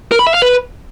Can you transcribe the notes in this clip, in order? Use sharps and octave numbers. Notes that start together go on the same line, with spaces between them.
A#4
B5
E5
F5
B4